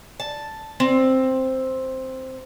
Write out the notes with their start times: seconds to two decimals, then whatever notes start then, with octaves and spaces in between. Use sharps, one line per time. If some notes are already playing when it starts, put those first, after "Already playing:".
0.20 A5
0.80 C4